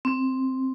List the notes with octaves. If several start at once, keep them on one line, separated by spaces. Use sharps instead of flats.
C4